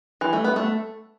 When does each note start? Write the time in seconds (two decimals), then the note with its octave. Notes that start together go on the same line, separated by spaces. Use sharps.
0.21 E3
0.33 A3
0.44 B3
0.56 A3